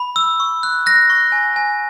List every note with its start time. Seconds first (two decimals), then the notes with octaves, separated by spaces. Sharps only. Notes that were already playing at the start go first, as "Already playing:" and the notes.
Already playing: B5
0.16 E6
0.40 C#6
0.63 F#6
0.86 F#6 A#6
1.10 C#6
1.32 G#5
1.56 G#5